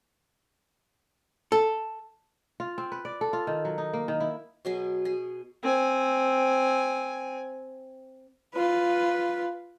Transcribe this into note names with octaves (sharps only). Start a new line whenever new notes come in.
A4
F4
C4
B4
D5
A4
F4
D#3
F#3
D#4
A#3
D#3
E4
B2 F#3 G#4
G#4
C4 G#5
F4 B4